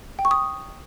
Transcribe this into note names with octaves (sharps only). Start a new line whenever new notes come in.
G5
C#6
D#6